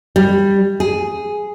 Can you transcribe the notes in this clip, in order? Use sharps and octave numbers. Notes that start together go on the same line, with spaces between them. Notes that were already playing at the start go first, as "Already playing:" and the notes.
G3
G#4